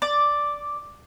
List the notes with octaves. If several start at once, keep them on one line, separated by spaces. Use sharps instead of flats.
D5